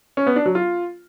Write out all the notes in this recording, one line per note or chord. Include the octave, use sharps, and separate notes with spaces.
C#4
B3
D4
F#3
F4